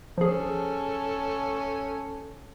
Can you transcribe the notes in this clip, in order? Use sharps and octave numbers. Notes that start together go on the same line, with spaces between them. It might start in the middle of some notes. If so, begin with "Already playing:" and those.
F3 C#4 G#4 A4